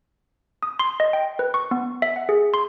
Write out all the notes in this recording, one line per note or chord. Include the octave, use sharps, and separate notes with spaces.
D#6
C6
D#5
G5
B4
C#6
B3
E5
F#5
G#4
C6